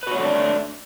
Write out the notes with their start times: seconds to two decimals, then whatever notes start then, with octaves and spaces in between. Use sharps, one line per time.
0.03 B4
0.07 F#4
0.11 C#5
0.16 A3
0.20 D4